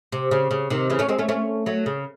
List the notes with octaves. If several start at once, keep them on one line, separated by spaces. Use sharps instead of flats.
C3
C#3
C#3
C3 D#3
C#3 E3
A3 C#4
G#3 C4
A3 C#4
A3 C#4
F#3 A3
C#3